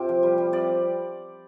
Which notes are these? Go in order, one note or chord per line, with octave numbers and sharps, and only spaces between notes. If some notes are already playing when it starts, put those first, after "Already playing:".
Already playing: C3 F4 G4
F3
G3
G3
C3 D5